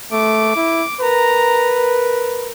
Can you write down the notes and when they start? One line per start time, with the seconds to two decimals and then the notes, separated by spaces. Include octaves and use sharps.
0.12 A3 D6
0.56 E4
1.01 A#4 B4 A#5
1.79 A#4